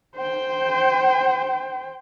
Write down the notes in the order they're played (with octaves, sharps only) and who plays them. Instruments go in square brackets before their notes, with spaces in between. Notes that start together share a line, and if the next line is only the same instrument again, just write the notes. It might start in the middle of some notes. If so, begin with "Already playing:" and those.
[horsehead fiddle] C5 G5